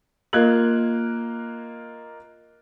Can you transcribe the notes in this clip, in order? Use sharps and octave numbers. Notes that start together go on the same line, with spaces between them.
A#3 F4 D#5 F#6 G#6 F#7